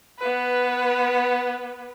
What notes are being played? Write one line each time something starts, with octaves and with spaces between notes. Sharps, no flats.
B3 B4